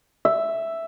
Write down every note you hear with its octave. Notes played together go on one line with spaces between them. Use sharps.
E5